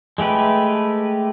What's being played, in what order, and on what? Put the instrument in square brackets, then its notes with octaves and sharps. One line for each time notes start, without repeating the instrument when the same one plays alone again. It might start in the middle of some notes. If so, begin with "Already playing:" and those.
[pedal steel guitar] G#3 A3 G4 B4